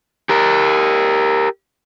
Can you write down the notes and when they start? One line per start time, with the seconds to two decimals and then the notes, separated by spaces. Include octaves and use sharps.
0.29 G4 A#4